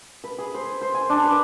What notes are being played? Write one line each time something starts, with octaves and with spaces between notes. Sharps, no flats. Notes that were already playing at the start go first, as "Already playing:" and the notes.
B4
G#4
C5
C5
G#5
D4
B4